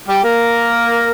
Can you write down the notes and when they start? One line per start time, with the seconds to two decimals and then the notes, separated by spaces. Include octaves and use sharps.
0.08 G3 G4
0.24 A#3 A#4